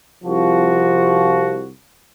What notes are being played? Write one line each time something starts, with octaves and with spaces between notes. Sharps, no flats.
C2 F3 F#4